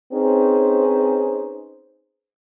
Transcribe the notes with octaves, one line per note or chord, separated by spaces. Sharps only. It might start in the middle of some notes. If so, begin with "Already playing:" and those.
C4 C#4 D#4 G#4 B4 C5